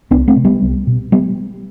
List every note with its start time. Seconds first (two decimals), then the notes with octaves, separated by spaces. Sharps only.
0.11 C2 B3 D4
0.28 A3 C4
0.36 C3
0.45 G3 B3
0.62 C2
0.87 B2
1.12 G3 B3